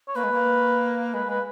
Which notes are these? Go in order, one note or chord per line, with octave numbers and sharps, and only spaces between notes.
C#5
A#3 B4
G#3
A#3
G#3 B4
G#3 B4